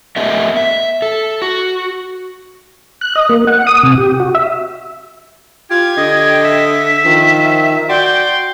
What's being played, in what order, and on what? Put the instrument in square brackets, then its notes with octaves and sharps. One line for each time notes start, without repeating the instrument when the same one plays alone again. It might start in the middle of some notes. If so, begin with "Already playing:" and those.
[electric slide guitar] A3 B3 G4 A#4 D#5 E5
E5
A4
F#4
[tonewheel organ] F#6
D#5
A#3
F#5
D#6
C3
G4
F#4
E5
[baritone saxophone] F4 [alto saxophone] G4 [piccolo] G#6
[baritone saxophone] D3 [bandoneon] D#5
[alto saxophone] E5 [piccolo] B6
[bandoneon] D#3 [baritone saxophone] F3
[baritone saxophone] F#4 [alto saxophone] D5 [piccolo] G5 [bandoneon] C6